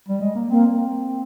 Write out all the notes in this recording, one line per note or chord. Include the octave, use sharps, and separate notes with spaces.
G3
G#3
A#3
A#3 C4